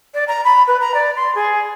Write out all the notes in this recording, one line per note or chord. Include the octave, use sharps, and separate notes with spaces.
D5
A#5
B5
B4
A#5
D5
C6
G#4